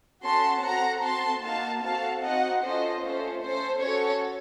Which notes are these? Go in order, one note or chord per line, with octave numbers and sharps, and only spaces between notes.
C#4 F#4 A4 A5 C6
C4 F#4 A4 F#5 A#5
C4 F#4 A4 A5 C6
A#3 D#4 F#4 F5 A5
C4 F#4 A4 F5 A5
C4 D#4 F#4 D#5 F#5
C#4 F4 A4 C5 D#5
A3 C#4 F4 C5
C#4 A4 C5
C#4 F#4 A4 C#5